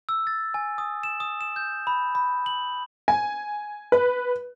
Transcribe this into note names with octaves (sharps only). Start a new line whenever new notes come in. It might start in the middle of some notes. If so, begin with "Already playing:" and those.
E6
A6
G#5
D#6
E7
D#6
E7
G6
B5
B5
F#7
G#5
B4